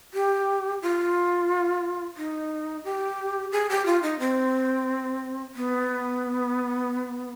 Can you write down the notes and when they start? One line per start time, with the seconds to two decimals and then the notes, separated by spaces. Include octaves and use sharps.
0.14 G4
0.82 F4
2.17 D#4
2.84 G4
3.52 G#4
3.70 G4
3.86 F4
4.03 D#4
4.20 C4
5.55 B3